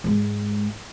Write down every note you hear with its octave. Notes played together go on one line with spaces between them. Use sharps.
G#2 G#3